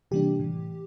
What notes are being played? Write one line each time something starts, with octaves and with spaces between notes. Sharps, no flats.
C3 E3 G3 A#3 D4 G4
A2 E3